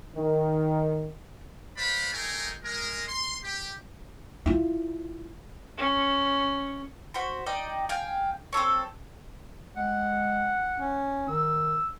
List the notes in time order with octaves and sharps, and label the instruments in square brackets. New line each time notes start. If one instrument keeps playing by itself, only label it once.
[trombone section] D#3
[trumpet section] B4 C5 D5 F5 B5
A3 D#4 G#4 A#4 G5 G#5
G#3 A#4
C6
G4
[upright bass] E4 F4
[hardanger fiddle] C#4
[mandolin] F#4 C5 B5
D#4 D5 D#5 G5
F5 G5 G#5
C4 F4 A4 C#5
[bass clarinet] G#3 [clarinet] F#5
[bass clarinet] C#4
[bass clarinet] D#3 [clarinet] E6